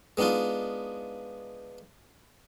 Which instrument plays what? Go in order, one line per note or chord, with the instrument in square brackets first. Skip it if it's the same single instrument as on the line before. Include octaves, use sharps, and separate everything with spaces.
[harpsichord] G#3 B3 D4 D#4 F4